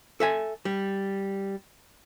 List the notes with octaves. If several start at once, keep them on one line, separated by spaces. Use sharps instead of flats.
A4 E5 G#5
G3